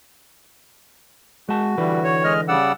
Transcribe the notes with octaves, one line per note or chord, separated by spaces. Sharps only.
G#3 F#4 A5
D3 E3 G3 B4
C#5
G#3 D#5 F6
C#3 G3 D5 F#5 E6